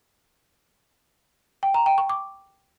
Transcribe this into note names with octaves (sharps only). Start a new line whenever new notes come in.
G5
A#5
G5
C#6
D6